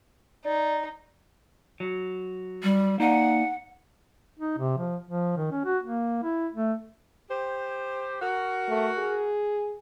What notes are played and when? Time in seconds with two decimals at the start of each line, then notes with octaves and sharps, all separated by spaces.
0.45 D#4 D5
1.80 F#3
2.63 G3
3.00 A#3 D#4 D5 F#5
4.39 D#4
4.58 C3
4.78 F3
5.05 F3
5.37 D#3
5.51 C#4
5.65 F#4
5.83 A#3
6.24 E4
6.54 A3
7.30 G4 C5
8.22 F#4 A#4
8.69 A3
8.98 G#4